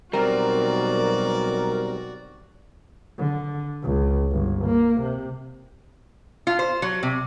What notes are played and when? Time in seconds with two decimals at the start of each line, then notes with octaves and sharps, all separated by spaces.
0.13 B1 G3 C4 F#4 A#4 D5
3.18 D3
3.83 C#2
4.31 G1
4.65 A#3
5.01 C3
6.47 F4
6.59 C5
6.82 F#3
7.03 C3